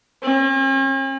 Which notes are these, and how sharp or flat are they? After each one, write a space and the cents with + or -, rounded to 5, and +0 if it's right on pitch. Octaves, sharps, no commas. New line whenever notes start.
C#4 -45